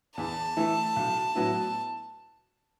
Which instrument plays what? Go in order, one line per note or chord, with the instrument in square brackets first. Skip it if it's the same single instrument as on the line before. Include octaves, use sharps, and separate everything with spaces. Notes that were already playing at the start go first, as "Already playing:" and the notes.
[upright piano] E2 [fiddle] A5
[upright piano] E3 A3 E4
B1
A2 F#3 B3 E4